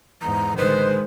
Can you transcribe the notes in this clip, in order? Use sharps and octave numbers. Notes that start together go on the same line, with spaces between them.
E2 G#2 A#5
A1 D3 D#3 G#3 B4 C5